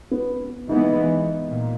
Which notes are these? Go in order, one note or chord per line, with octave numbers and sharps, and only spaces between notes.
B3
E3 G#3 B3 D#4
A#2